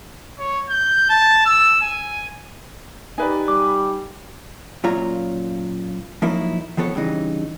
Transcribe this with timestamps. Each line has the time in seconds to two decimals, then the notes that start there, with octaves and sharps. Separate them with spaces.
0.39 C#5
0.69 G6
1.10 A5
1.46 E6
1.81 G#5
3.18 D#4 G4 B4 D5 G#5
3.48 G3 D6
4.84 F#2 A#2 F4 C#5 A#5
6.22 F3 F#3 A#3 D#4 E4
6.77 D#3 F3 B3 A4 C#5
6.95 G2 C#3 E3 D#4